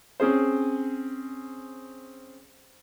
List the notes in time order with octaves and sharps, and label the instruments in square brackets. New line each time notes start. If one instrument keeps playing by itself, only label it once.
[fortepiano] C4 C#4 G#4 C5